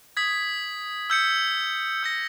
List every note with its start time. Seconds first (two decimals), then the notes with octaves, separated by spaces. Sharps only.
0.17 D#6 G#6 B6
1.10 E6 G6 C#7
2.03 E6 G6 A#6